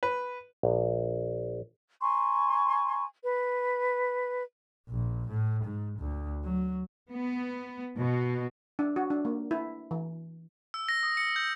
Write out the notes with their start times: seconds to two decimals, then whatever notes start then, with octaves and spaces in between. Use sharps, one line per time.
0.03 B4
0.63 A#1
2.02 G#5 A#5 C6 C#6
3.24 B4
4.89 A#1
5.28 A2
5.64 G#2
5.99 D2
6.44 F#3
7.13 B3
8.00 B2
8.79 D4
8.96 F#4
9.10 D4
9.25 A#3
9.51 E4
9.91 E3
10.74 E6
10.89 A#6
11.03 D#6
11.17 C#7
11.36 G6